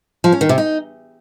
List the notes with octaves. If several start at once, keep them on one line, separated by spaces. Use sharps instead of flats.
F3
C#4
D#3
C3
D#4